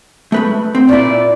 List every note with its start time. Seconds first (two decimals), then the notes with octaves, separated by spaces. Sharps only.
0.32 A3 B4 B5
0.75 C4
0.89 A#2 E4 D5